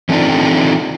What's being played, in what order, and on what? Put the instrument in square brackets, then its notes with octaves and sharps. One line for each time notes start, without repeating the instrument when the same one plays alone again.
[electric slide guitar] E3 A3 C4 D4 D#4 F4